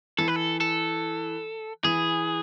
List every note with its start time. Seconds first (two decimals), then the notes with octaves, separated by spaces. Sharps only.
0.18 E3 A4
0.28 B4
0.36 A4
0.60 A4
1.84 E3 G#4